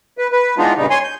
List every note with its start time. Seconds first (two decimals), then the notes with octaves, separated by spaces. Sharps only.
0.18 B4
0.32 B4
0.58 E3 G#3 B3 D4 D#4 F4
0.77 G2 A#2 C#3 G3 D#4
0.90 C#5 G#5 C6
1.04 G6